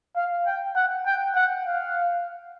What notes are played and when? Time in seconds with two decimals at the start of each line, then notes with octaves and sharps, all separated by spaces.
0.16 F5
0.46 G5
0.76 F#5
1.06 G5
1.36 F#5
1.65 F5